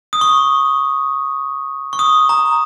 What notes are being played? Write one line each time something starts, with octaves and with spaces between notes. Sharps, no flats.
D#6
C#6
C#6
D#6
A#5